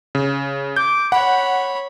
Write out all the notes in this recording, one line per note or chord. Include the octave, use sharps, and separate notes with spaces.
C#3
D6 G6
C#5 F#5 B5